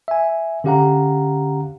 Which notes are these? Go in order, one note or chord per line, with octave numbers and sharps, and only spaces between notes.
E5 G#5
D3 C#4 G4 F5 F#5 A#5